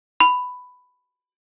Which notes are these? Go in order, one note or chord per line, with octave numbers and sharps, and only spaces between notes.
B5